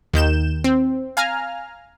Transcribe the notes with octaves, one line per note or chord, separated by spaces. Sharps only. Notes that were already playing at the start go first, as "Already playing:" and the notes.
D#2 D#3 G6 E7
C4
F5 G#5 A#5 F6